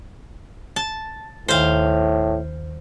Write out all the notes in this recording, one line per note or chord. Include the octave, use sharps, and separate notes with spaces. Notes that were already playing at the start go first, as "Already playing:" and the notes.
A5
D#2 A2 D#3 C5 F5